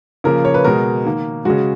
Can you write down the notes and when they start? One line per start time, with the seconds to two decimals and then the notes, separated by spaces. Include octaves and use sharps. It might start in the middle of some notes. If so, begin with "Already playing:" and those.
0.24 C#3 F3 A#3 A#4
0.45 C#5
0.54 B4
0.64 B2 G#3 A#4
1.05 D#3 A#3
1.45 C#3 G#3 F#4